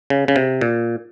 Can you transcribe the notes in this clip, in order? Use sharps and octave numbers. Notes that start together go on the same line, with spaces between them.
C#3
C#3
C3
A#2